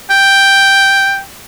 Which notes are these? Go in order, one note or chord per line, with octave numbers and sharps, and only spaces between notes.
G5